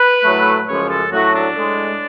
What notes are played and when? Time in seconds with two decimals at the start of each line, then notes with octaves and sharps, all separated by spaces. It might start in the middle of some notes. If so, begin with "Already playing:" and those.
Already playing: B4
0.24 A2 F#3 A3
0.68 F#2 C#3 F3 G#3 C#5
0.90 A4
1.12 A2 F#3 A3 F#4
1.34 D4
1.56 A2 G#3